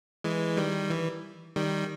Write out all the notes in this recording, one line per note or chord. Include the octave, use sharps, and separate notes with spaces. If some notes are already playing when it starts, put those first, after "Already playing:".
E3 G#3
D#3 G3
E3
D#3 G3